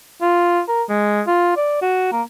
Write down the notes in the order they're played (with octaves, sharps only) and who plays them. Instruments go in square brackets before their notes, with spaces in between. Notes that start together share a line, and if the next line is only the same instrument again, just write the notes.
[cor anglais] F4
A#4
G#3
F4
D5
F#4
A#3